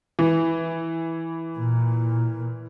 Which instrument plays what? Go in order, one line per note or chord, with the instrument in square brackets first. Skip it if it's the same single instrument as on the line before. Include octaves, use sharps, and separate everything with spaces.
[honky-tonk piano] E3
[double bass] A#2